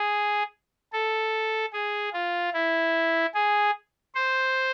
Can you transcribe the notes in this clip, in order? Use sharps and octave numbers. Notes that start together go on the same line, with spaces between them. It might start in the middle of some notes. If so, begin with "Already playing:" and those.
Already playing: G#4
A4
G#4
F4
E4
G#4
C5